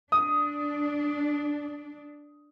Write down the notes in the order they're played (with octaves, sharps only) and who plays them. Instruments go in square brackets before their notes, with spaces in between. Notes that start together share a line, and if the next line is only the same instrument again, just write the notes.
[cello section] D4 [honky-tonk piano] D#6